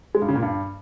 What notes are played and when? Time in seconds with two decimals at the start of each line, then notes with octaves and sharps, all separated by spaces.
0.15 G#3
0.22 G2
0.28 C#3
0.35 A#2
0.42 G2